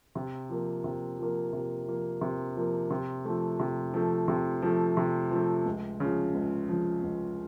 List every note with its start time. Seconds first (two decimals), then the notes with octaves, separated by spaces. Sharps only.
0.15 C3
0.49 F3 A#3
0.84 C3
1.18 F3 A#3
1.53 C3
1.87 F3 A#3
2.21 C3
2.56 F3 A#3
2.90 C3
3.25 F3 A3
3.59 C3
3.94 F3 A3
4.28 C3
4.62 F3 A3
4.97 C3
5.31 F3 A3
5.66 C#2
6.00 C#3 F3
6.34 C#2
6.69 C#3 F3
7.03 C#2